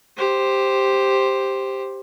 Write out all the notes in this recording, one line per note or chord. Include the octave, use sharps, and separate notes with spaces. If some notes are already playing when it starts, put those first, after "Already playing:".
G4 C5